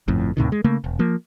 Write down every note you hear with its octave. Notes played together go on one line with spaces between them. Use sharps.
G1 F2 A2
D#2 A2 C3 D#3
G#3
C#3 A3 A#3
E1
F3 A#3